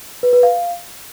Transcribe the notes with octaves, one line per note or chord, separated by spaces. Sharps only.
B4
B4
F5